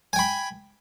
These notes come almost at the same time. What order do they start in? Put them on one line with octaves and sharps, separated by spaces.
G#5 G5 B5